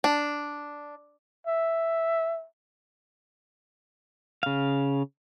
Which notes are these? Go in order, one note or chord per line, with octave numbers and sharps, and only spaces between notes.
D4
E5
C#3 F5